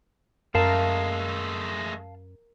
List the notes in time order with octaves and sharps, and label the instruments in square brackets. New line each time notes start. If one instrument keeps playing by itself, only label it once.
[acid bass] F#2 [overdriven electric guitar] G#3 A3 [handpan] A#4 [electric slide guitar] F5 A5